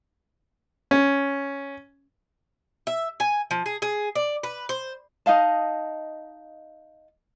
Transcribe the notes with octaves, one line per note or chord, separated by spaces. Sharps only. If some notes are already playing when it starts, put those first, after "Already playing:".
C#4
E5
G#5
F3
G#4
G#4
D5
B4
C5
D#4 D#5 F5 A5